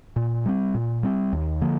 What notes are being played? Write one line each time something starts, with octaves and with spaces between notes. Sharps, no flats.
A#2
G3 C4
A#2
G3 C4
D#2
D3 F3 A#3